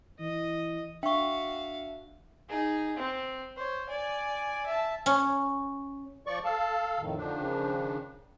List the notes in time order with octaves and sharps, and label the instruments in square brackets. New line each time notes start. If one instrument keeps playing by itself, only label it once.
[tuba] E3 [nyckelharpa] D#5
[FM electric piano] D4 [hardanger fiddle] F#4 F5 [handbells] E5 [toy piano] G5 C#6
[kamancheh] D#4 G#4
C4
C5 C#5
D5 G#5
E5 A5
[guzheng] C#4
[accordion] F3 D5 C#6
[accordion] A4 F5 [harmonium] A5
[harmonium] F2 A2 D#3
[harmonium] D3 [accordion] D#3 F3 D4
[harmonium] C#3